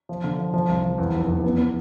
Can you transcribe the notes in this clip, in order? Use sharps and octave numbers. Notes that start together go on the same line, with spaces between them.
F3
D3
F3
F3
C2
F3
E2
F1
E2
B3
B3